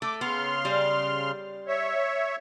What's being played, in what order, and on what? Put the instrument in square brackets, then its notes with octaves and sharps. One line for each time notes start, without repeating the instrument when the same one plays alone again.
[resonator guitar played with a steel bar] A3 [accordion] D6
[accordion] C#3 C6 F6 [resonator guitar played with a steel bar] B3
[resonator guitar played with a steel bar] G3
[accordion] C#5 E5